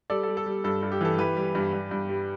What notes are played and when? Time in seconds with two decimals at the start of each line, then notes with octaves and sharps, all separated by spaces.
0.10 G3 A4 D5
0.23 A4
0.28 G3
0.37 A4
0.46 G3
0.64 G2 A4
0.83 G2
0.92 G4
1.01 E3 A4
1.18 E3 G4 B4
1.37 G3
1.55 G2
1.73 G2
1.91 G2
2.09 G3